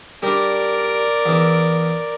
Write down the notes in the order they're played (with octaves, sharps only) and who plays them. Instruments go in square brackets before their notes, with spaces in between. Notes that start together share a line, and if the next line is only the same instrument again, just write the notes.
[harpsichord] G3 D4 [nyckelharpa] A#4 D5
[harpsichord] E2 E3